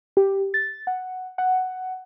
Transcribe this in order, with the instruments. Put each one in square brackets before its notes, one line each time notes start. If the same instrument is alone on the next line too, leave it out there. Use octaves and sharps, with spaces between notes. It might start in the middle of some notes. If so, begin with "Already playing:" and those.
[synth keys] G4
A6
F#5
F#5